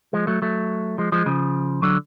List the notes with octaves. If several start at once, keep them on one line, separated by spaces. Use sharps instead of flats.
F3 G#3
F#3 A3
F#3 A3
F3 G#3
F3 G#3
C#3 F3
D3 F#3